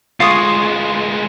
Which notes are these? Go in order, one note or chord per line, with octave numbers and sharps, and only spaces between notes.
D2 G#3 F4 C#6 D#6